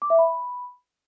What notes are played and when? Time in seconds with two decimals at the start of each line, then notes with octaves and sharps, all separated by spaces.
0.02 D6
0.10 E5
0.19 B5